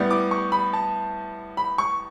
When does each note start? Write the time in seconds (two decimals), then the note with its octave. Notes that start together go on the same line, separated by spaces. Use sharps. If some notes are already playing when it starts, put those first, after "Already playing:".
Already playing: A2 G3 B3
0.10 D6
0.31 C#6
0.52 B5
0.73 A5
1.57 B5
1.78 C#6